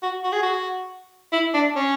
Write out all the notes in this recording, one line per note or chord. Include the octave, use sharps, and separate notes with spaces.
F#4
F#4
G#4
F#4
E4
D4
C#4